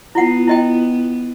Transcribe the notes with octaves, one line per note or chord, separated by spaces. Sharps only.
B3 E4 F4 F#5
E4 D#5 G5